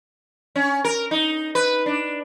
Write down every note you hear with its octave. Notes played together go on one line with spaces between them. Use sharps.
C#4
A#4
D#4
B4
D4